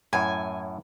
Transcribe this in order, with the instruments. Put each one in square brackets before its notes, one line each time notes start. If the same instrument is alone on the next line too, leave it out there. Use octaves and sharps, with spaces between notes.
[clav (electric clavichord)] F#2 A2 [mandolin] G#5